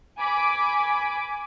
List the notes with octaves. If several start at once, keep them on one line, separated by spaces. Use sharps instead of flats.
G#5 B5 D6